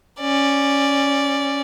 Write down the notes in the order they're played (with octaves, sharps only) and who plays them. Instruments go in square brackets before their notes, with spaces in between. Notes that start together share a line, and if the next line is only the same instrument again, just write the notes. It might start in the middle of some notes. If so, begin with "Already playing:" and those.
[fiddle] C#4 D5